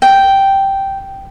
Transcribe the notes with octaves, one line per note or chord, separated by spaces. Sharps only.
G5